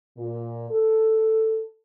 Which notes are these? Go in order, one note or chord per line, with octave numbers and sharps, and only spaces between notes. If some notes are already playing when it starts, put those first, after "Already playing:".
A#2
A4